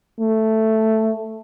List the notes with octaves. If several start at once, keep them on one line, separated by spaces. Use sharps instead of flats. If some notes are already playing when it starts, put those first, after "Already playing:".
A3